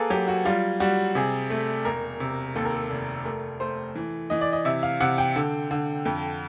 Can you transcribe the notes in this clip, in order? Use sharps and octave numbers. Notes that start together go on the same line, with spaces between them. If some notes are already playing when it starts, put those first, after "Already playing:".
Already playing: A#3 G#4 A4 B4
F#3 G4
F#4
G3 F4
G3 F#4
C3 G#4
A3
E1 A#4
C3
D#2 A4
A#4
A4
F1
A3 A#4
A3 C5
E3
E3 D#5
D5
D#5
C3 E5
F5
C3 F#5
G5
D3
D3
F2